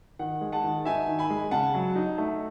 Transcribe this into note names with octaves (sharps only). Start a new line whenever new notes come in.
D#3 F#5
G#3
F#5 A5
D#3
D#4 E5 G#5
D#3
G#5 B5
G#3
C#3 F#5 A5
F#3
D#4
A3